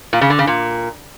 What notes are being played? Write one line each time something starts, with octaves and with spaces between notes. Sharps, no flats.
A#2
C#3
D3
C#3
A#2